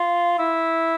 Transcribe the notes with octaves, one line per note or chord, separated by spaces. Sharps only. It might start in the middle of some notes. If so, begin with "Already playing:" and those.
Already playing: F4
E4